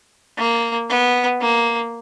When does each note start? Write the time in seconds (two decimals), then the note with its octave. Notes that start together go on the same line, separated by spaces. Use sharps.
0.38 A#3
0.89 B3
1.41 A#3